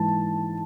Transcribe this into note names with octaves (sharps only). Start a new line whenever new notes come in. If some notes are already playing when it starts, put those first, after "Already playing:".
Already playing: G#2 E3 A5